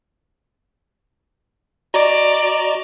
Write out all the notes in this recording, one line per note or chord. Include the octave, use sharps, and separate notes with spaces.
F#4 D5 D#5 A#5